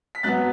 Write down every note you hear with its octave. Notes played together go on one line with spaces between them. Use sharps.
B6
G#2 F#3 B3 F#6 A6